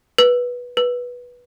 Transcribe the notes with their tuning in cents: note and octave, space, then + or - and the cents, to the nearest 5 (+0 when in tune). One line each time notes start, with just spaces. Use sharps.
B4 -10
B4 -10